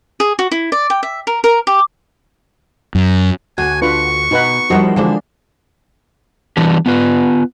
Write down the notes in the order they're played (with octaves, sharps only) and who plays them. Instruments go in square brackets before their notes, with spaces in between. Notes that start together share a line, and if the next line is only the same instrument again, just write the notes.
[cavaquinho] G#4
F#4
E4
D5
G5
E5
A#4
A#4
G4
[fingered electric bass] F#2
[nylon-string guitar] D2 [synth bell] F#4 [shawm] G#5
[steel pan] D4 F4 B4 [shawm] C#6
[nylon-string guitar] B2 [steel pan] D#4 B4 F#5
[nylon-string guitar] F3 G3 E4 [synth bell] D#4 A#4 C5 [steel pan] F#4
[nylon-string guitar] D3 E3 C5 [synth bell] F3 G#3 D4
[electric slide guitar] E3 G3 B3 D4 G4
B3 F4 B4